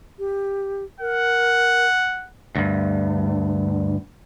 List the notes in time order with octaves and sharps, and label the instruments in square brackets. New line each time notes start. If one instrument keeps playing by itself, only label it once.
[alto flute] G4
[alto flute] A#4 [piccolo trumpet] F#5
[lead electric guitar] D2 G2